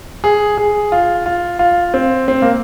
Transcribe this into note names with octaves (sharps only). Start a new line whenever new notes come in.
G#4
G#4
F4
F4
F4
C4
C4
A#3